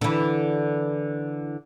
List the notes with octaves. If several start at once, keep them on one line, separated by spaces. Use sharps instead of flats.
D3 E3